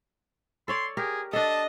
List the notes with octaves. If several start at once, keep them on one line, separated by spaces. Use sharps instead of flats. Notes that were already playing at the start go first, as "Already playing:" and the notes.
A4 C#5 D5 C6
G4 G#4 A#4
D4 A4 D#5 A5